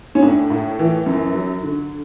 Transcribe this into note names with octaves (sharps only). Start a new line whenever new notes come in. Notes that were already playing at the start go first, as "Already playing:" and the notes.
C#4
A2 D4
A2
E3
F#2
F#3
D3